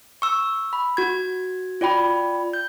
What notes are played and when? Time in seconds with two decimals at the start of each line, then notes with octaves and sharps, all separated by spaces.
0.22 C#6 E6
0.73 B5
0.97 F#4 G#6
1.81 F4 D5 G5 B5
2.53 G6